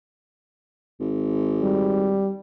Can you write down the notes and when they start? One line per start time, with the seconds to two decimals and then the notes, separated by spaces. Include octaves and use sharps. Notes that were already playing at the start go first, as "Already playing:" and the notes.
1.00 G#1
1.62 G3